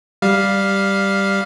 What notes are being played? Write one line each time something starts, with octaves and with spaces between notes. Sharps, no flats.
G3 F5